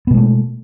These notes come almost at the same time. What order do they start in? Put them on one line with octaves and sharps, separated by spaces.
B3 B2 G#3 A3